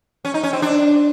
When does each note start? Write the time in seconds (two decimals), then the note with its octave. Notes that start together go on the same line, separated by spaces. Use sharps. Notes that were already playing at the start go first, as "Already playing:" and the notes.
0.25 C#4
0.34 D#4
0.43 C#4
0.53 C4
0.62 D4